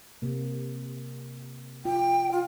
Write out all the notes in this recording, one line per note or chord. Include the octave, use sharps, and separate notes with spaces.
C3 A#3
F4 G5
F4